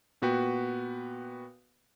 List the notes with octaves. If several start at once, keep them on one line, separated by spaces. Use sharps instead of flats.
A#2 B3 F#4 B4 G5